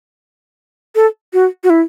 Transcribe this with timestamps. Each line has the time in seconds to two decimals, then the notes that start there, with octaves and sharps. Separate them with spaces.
0.95 A4
1.33 F#4
1.64 F#4
1.70 E4